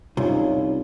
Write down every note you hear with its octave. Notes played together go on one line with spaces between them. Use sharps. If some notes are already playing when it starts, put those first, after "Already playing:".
C2 C#4 D#4 F4